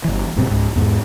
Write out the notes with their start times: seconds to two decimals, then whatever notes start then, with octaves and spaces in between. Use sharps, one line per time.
0.04 G1 E3
0.36 D1 G2 B2 C4
0.48 C#2 G#2
0.76 E2 G#2 G#3